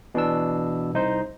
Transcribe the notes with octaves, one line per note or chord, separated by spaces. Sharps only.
B2 E3 D4 E6
C2 D#4 C5